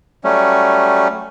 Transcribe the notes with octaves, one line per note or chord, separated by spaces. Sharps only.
F#3 G3 A3 C#4